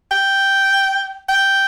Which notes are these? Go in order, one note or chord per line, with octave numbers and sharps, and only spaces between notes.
G5
G5